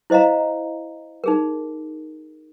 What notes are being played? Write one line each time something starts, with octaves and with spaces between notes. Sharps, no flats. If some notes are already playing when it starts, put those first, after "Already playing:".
E4 C5 D#5 F5 A#5
D#4 G#4 A#4